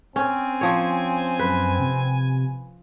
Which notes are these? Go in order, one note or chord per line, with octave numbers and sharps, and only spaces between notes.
C4 C#4 G#5
F3 C#5
F#2 B4
C3